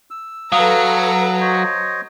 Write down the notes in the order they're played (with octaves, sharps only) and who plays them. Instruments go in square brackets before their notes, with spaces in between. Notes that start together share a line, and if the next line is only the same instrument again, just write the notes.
[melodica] E6
[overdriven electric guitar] F#3 [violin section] A4 B4 A#5 [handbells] F5 D#6
[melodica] C5 C#5 D#5